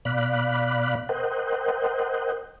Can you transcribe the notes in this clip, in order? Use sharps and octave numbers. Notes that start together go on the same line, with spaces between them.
B2 D5 F5 B5 F#6
A#4 C5 D#5 F#5 G5